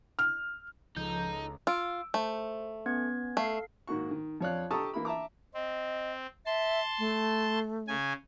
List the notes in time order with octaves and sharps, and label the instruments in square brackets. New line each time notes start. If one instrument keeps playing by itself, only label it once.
[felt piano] F6
[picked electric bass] C#2 [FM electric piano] F3 G6 [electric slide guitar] D#4 [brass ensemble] A4 A#5
[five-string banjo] F4 [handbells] E6 D7
[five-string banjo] A3 [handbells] C5
[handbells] B3 C#4 G#6
[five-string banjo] A3 [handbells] A4 F5 C7
[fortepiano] G#2 D#3 A#3 F#4 C#6
D#3
F2 F3 C#5 D5 F5 F#6
G4 A4 A5 A#5 C#6 D#6
E3 A#3 E4 B5
E5 A5 A#5 D6
[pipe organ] C4 [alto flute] D#5
[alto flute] E5 [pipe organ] A5 C6
[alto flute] A3
[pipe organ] C#3 G#5